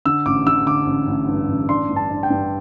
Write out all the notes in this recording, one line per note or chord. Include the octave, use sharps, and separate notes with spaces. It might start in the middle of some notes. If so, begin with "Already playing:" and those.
D3 E6
A1 D6
D3 E6
D3 D6
A1
A1
G2
A1
D4 C6
G2
A5
D4
G5
G2